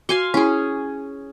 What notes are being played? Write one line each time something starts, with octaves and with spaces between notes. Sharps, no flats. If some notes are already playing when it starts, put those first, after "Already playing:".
F#4 F5 G#5 C6
C#4 E4 G#4